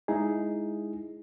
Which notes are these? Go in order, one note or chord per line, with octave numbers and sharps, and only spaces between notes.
G#3 D#4 E4 G#4